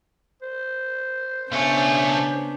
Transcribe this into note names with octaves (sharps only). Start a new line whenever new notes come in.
C5
B1 C#3 A3 B3 C#4 D4